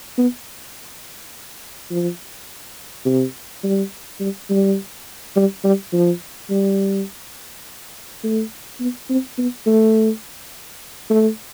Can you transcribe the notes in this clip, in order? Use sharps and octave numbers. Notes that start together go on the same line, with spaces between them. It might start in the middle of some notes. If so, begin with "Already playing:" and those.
B3
F3
C3
G3
G3
G3
G3
G3
F3
G3
A3
B3
C4
B3
A3
A3